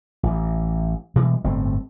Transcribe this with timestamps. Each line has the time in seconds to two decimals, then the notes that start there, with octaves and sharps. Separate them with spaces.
0.23 A1 E3
1.16 B2 E3 G3 G#3
1.45 G1 A2 A3 C4